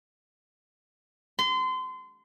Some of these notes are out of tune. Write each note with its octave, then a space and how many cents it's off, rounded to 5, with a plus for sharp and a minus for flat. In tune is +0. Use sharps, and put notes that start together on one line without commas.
C6 -30